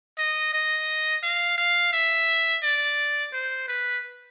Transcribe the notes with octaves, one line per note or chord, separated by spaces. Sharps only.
D#5
D#5
F5
F5
E5
D5
C5
B4